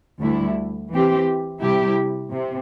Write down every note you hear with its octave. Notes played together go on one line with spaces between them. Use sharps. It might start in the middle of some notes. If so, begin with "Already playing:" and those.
D2 D3 G3 E4
E3 C4 G4
C3 G3 E4 G4
C3